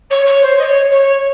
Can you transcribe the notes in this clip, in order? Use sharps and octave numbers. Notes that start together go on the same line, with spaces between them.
C#5
C#5
C5
D#5
C#5
C#5